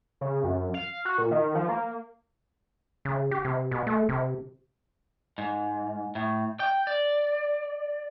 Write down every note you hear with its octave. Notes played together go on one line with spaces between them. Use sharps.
C#3
F#2
F5
F#4
A#2
D#3
F3
A#3
C#3
G4
C3
B2
A3
C3
G#2
A2
G5
D5